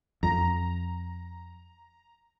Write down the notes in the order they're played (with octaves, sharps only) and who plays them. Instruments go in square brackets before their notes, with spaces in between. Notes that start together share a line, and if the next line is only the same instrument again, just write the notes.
[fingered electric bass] F2 [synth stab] A#5